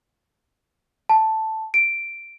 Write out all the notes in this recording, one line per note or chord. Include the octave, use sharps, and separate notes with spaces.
A5
D7